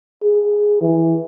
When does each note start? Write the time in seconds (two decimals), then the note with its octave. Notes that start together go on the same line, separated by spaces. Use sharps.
0.23 G#4
0.81 E3